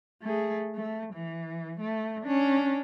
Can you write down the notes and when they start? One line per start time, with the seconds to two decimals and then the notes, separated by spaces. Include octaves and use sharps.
0.22 A3 G#4
0.75 A3
1.14 E3
1.80 A3
2.23 C#4 D4